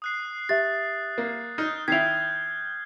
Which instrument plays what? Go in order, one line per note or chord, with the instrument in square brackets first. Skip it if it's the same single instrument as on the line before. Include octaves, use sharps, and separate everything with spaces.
[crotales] D#6 F#6 C7
[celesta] G4 E5 [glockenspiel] A6
[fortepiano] A#3
[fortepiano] D#4 [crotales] F6 G6
[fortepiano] D#3 E4 [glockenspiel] G#6 [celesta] B6 C7 F7